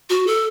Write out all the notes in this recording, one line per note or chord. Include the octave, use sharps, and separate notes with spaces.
F#4
A4